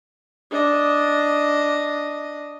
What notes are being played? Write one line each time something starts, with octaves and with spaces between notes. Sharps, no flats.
D4 D#5